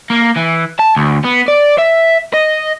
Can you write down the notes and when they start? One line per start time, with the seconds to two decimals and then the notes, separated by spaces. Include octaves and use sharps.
0.10 A#3
0.37 E3
0.79 A5
0.96 D2
1.25 B3
1.48 D5
1.78 E5
2.34 D#5